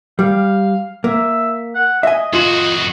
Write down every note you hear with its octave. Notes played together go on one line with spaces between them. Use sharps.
G3 F5
A#3 E5
F#5
D#5 E5 G#5
F2 F4 F#4